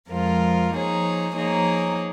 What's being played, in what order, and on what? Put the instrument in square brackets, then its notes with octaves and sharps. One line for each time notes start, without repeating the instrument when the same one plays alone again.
[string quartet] F2 F3 G#3 F4 A#4
F3 A#3 D#4 G#4 C#5
F3 A#3 D#4 G#4 C#5